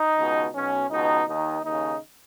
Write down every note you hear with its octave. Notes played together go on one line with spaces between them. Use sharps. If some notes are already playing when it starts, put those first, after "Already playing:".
Already playing: D#4
C#2 B2
B1 B2 C#4
C#2 B2 D#4
D#2 D#3 D#4
D#2 C#3 D#4